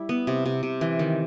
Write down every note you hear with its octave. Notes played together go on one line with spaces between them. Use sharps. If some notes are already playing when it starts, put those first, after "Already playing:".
Already playing: G3 E4
B3
C3
C3
C3
E3
D#3